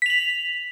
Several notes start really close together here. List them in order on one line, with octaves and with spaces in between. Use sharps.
B6 F7 F#7